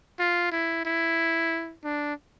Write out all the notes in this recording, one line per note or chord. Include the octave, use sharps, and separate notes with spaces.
F4
E4
E4
D4